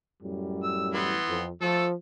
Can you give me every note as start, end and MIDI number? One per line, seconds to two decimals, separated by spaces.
0.23 1.19 42
0.23 1.19 45
0.23 1.19 55
0.63 0.88 88
0.94 1.42 52
0.94 1.42 59
0.94 1.42 84
1.29 1.50 41
1.62 1.94 53
1.62 1.85 57
1.62 1.85 69
1.62 1.85 88